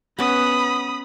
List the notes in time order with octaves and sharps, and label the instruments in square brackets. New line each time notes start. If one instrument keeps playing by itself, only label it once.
[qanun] B3 C#4 [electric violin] B5 D#6